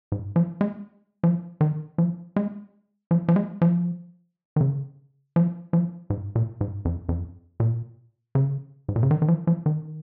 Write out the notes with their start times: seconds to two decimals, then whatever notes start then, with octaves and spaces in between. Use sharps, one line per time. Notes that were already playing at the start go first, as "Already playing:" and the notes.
0.12 G#2
0.36 F3
0.61 G#3
1.23 F3
1.61 D#3
1.98 F3
2.36 G#3
3.11 F3
3.28 F3
3.36 G#3
3.62 F3
4.56 D#3
4.61 C#3
5.36 F3
5.73 F3
6.10 G#2
6.35 A#2
6.61 G#2
6.85 F2
7.09 F2
7.60 A#2
8.35 C#3
8.88 G#2
8.96 A#2
9.03 C#3
9.11 D#3
9.22 D#3
9.28 F3
9.47 F3
9.66 D#3